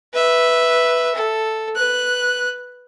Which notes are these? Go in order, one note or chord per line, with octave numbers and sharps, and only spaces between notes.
B4 E5
A4
B4 F#6